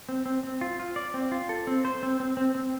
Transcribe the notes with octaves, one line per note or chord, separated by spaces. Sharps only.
C4
C4
C4
F4
F4
D5
C4
F4
A4
C4
C5
C4
C4
C4
C4